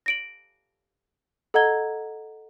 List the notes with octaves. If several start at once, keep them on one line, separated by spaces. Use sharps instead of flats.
A#6 D7 F#7
A4 D#5 F#5 A#5 G#6 G7